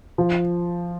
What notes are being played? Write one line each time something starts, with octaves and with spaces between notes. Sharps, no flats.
F3